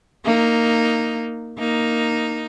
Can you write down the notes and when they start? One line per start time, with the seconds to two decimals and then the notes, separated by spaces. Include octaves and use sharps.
0.25 A#3 D#4
1.58 A#3 D#4